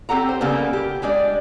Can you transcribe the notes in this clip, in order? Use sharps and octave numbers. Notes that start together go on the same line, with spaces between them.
C4 G4 A4 F#5 A#5
C5
C#3 G3 A#3 B3 A4
G4
G3 G#3 D4 D5